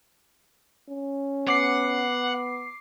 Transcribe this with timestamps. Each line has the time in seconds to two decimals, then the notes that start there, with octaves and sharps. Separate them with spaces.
0.90 C#4
1.48 B3 F#5 D6 C7